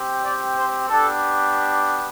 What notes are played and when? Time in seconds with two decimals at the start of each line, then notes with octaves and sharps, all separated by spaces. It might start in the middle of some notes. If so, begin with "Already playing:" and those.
Already playing: C4 G4
0.24 D5
0.57 C5
0.89 B3 D4 G4 A4